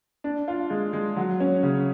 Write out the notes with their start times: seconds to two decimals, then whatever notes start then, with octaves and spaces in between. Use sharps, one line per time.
0.24 D4
0.48 F4
0.70 G#3
0.93 G#3
1.16 F#3
1.40 C#4
1.63 C#3